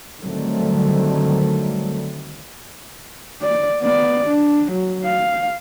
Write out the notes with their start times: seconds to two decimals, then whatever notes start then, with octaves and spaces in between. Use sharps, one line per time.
0.19 D3 D#3 F#3 G3 A3 C4
3.42 D5
3.81 B3 D5
4.28 D4
4.72 F#3
5.05 F5